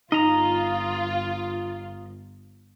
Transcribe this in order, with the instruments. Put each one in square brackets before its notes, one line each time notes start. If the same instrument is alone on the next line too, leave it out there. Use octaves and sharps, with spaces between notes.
[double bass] G1 [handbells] D#4 [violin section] F4 [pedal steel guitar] D#5 A#5